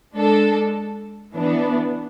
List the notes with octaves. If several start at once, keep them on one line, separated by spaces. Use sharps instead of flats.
G#3 D4 A4
E3 B3 D4